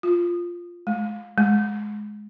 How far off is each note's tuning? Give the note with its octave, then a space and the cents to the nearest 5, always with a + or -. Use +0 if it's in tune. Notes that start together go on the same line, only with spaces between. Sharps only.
F4 +0
G#3 +20
G#3 +10